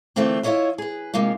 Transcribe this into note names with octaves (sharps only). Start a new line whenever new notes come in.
D3 E3 A3 A#3 C4 F4
E4 F4 A#4 C#5 D#5 E5
G#4 B4
C3 G#3 A#3 D#4 F4